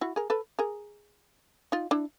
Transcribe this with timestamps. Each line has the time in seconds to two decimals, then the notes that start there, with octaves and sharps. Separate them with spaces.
0.01 E4 F#4
0.16 G#4 A#4
0.30 A4 B4
0.59 G#4 A#4
1.72 D#4 F4
1.91 D4 E4